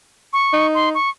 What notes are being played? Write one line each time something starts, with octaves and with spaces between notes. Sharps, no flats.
C#6
D#4
C6
C#6